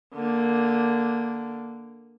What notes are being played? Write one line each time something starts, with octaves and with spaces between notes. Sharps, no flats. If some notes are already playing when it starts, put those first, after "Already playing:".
D3 A#3